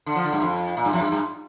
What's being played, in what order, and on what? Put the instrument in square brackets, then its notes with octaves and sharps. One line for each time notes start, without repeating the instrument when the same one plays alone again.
[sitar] D3
F3
D3
G2
F2
A#2
G2
F2
G2
G2